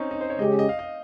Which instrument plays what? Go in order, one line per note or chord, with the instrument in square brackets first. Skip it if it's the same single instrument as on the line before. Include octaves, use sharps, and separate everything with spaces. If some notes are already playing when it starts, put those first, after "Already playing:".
Already playing: [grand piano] C4 C#4 D#4
D#4
C5
C#5
[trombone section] C#3 G#3 C#4 G4 [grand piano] D#5
[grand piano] D#5
F5
D#5